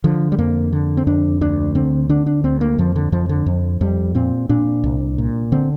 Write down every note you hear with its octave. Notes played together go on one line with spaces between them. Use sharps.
D3 F3
G3
F2 A#3
D3
C4
F2 D4
D2 D4
D3 C4
D3 D4
D4
D2 C4
A#3
F2 F3
D3
F2 F3
D3
F2
F2 G3
A#2 C4
A#2 D4
C2
A#2
D3 C4